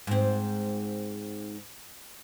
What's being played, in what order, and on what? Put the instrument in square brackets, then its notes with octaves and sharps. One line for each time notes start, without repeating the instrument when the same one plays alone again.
[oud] G#2 C4